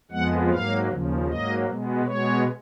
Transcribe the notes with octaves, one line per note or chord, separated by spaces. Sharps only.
F2 F3 G#3 B3 F#5
G#2 F#3 A#3 F5
D#2 C#3 F3
G#2 F#3 A#3 D#5
B2 G#3 B3
B2 G#3 B3 C#5